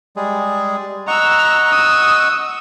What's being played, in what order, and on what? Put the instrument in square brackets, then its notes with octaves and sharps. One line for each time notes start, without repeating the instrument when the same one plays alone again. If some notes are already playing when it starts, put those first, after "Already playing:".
[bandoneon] G3 G#3 G#4
[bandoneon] D#5 F#5 C#6 [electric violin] A#5 E6
[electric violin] D#6 E6